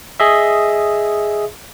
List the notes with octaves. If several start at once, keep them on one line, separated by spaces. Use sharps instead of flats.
G#4 D#5 E5